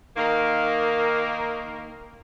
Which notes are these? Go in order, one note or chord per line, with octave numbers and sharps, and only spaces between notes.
D#3 A#3